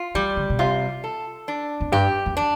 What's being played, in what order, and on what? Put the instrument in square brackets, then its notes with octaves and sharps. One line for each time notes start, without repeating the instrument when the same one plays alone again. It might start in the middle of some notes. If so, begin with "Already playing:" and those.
Already playing: [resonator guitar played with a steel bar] F4
[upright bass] E3 [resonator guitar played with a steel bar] G3
[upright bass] D3
B2
[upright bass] C3 [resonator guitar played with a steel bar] F4
[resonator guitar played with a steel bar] A4
D4
[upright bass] F2
[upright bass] G2 [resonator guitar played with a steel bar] G4
[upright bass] F2
[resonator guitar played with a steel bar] D4